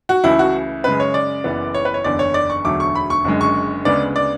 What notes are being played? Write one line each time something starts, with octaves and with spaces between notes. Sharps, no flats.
F#4
C#2 C#3 E3 A3 E4
F#4
F#2 C#3 G#3 B4
C#5
D5
F#1 F#2 E3 B3
C#5
B4
C#5
F#1 E2 D3 D5
C#5
D5
C#6
E1 D2 D3 F#3 A3 D6
C#6
B5
C#6
F#1 F#2 D3 G#3
C#6
D2 C#3 G#3 B3 D5
D5